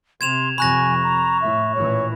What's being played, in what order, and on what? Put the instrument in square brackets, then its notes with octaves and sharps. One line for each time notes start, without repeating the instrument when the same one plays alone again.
[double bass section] C3 [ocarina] C6 [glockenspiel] G#6 E7 F7
[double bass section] F2 C3 [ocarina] G#5 [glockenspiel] B5 F#6 A#6 [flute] C#6
[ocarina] A#5
[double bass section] A2 [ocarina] E5
[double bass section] A1 A#2 E3 [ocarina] C#5